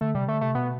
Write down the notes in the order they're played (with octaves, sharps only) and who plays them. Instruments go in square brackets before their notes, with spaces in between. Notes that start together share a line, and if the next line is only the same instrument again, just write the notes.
[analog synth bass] D3 [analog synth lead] A3
[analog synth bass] C3 [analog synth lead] G3
[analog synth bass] D3 [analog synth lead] A3
[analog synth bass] C3 [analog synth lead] A3
[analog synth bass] B2 [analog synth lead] B3